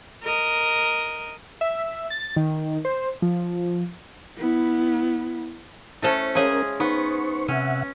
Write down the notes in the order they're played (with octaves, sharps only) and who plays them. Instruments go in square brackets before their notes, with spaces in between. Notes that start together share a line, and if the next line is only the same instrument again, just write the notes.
[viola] A#4 D#5
[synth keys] E5
A6
D#3
C5
F3
[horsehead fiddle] B3 E4
[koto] A3 C#4 A4 [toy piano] E4 C5
[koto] G#3 G#4 [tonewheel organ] C#4 A#4 [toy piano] C#5 F5 A5
[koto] B3 [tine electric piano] D#4 [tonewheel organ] C5 C#6
[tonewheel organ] C3 E5 F#5 [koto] C#4